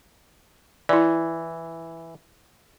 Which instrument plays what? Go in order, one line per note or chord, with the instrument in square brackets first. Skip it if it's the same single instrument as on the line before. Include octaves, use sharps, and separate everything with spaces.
[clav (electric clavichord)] E3 [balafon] E4 D5